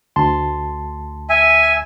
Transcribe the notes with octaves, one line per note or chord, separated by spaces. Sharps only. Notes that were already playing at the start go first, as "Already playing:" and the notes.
D2 A5 C6
E5 G#5